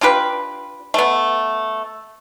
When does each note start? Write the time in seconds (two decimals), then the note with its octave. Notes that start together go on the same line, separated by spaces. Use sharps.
0.01 D4 F4 G4 B4
0.94 A3 B3